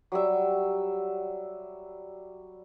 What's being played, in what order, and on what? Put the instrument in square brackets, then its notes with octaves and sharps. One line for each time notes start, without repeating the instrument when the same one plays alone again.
[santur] F#3 G3 E5